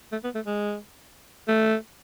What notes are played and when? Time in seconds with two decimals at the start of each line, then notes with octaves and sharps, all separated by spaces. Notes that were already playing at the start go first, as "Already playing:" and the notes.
0.12 A3
0.24 B3
0.35 A3
0.46 G#3
1.48 A3